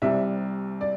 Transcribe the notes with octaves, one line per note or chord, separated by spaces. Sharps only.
C2 C3 G3 E5
D5